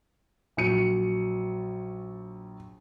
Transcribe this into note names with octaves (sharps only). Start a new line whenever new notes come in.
A#1 F#3 C#7 D#7